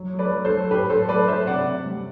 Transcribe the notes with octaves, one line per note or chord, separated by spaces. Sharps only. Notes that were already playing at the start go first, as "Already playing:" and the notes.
Already playing: F#3
F#3
B4 D5
F#3
A4 C5
F#3
A2 G4 B4
F#3 A4 C5
F#3 B4 D5
F#3 C5 E5
C3 D5 F#5
C3
G3